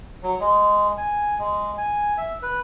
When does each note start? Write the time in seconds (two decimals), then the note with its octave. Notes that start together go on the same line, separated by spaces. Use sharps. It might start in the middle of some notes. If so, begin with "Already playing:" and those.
0.23 F#3
0.40 G#3
0.97 G#5
1.39 G#3
1.78 G#5
2.18 E5
2.42 B4